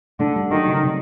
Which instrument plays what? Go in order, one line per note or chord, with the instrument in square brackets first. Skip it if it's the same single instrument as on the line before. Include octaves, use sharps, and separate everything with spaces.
[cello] D3 [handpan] A3
[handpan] G3
[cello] D#3 [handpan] F#3
[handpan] C#3
C3